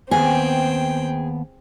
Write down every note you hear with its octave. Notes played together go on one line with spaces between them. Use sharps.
D#2 B3 C4 G#4 G5